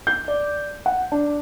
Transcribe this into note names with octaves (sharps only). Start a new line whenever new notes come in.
G6
D5
F#5
D4